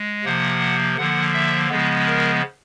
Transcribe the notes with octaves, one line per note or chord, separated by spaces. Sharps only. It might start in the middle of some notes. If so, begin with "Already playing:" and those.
Already playing: G#3
C3 F3 A#3 F#5
D3 F3 A#3 F#5
E5
C#3 F3 G#3 B3
A#4